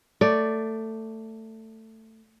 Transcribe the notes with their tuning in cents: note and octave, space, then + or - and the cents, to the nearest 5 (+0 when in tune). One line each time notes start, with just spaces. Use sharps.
A3 +15 D5 +0